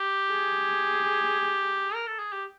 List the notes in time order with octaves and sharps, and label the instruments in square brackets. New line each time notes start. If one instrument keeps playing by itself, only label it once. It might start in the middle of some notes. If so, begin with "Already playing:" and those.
Already playing: [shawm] G4
[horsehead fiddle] G#4
[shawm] A#4
A4
G#4
G4